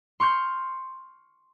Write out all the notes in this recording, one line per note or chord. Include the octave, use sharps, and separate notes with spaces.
C6 C#6 F6 G6 C7